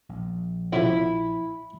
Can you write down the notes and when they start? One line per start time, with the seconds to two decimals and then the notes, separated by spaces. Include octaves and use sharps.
0.09 A#1
0.73 F2 C#3 F3 E4